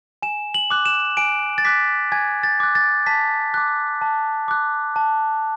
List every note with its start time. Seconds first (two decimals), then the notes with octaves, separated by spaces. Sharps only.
0.22 G#5 E7
0.54 F#7
0.70 D6 F#6
0.86 E7
1.17 G#5 D7
1.58 A6
1.65 D6 F#6 B6
2.12 G#5 G#6
2.43 A6
2.60 D6 F#6
2.75 A6
3.06 A5 B6
3.54 D6 F#6
4.02 A5
4.48 D6 F#6
4.96 A5